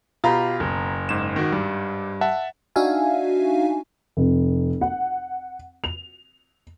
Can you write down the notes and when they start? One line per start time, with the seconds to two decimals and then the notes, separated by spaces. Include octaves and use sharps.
0.24 B2 F4 G4 A#5 B5
0.60 F#1
1.09 G#2 E7
1.36 D#3 F#4
1.52 G2
2.21 E5 F#5 A5
2.76 D4 D#4 F#4 E5 F5 G#5
4.17 F1
4.81 F#5
5.84 F7